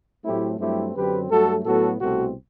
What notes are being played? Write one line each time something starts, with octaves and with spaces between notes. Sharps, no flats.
A2 F#3 A3 C4 E4 G4
G2 F#3 A3 C4 E4 G4
F#2 D3 F#3 C4 G4 B4
G2 F#3 A3 F#4 A4
A2 F#3 B3 F#4 A4
C2 B2 A3 C4 F#4 A4